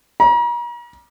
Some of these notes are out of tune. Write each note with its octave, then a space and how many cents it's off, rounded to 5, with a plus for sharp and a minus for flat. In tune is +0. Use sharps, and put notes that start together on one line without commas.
A#5 +40